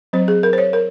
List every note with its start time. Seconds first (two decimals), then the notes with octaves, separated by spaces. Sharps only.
0.13 F#3 C4 C5
0.28 G#4
0.43 A#4
0.53 C5
0.58 C#5
0.73 A#4